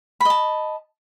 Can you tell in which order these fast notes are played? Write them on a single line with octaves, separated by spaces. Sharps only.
B5 D#5 A5